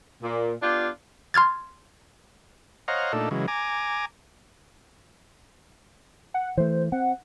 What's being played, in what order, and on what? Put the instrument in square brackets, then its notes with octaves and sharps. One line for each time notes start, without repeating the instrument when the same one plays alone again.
[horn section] A#2
B3 D4 F4 G4
[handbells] C6 F6 G#6 A6
[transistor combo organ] C5 C#5 D#5 F5 F#5 A#5
A#2 A3 D4 D#4 A4
C#3 E3 F#3 G#3
G#5 A#5 D6
[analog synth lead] F#5
[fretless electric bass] E3 A3 [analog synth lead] C5
[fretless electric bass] C4 [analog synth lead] F#5